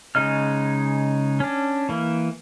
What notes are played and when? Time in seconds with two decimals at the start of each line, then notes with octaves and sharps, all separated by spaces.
0.15 C#3 G#3 D#4 D#5 F6
1.40 C#4 D4
1.89 E3 A#3